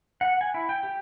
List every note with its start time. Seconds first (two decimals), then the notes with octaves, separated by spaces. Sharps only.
0.21 F#5
0.41 G#5
0.54 E4
0.69 G5
0.83 G4